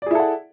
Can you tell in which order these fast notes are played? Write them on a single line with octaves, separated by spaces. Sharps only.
D5 G#4 E4 A4 F#5